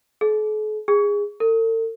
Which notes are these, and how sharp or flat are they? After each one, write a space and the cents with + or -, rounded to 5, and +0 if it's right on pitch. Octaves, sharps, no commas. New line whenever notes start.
A4 -45
G#4 -20
A4 +45